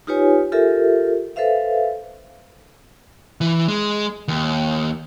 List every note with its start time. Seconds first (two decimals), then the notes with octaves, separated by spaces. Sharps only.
0.07 D#4 F4 G4 B4 C#5 G#5
0.52 F4 G4 A4 A#4 E5
1.36 A4 B4 C5 E5 F5
3.41 E3
3.68 G#3
4.28 D#2